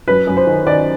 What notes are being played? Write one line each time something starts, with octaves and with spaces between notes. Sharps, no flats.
F#2 B4
F#2
C5
D#3
D#3 D5